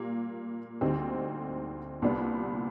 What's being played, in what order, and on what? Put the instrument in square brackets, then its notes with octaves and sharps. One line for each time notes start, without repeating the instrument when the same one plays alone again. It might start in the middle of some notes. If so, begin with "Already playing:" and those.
Already playing: [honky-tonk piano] A#2 G3 A#3
D2 D3 G3 C4 D#4
C2 A#2 G3 B3 D4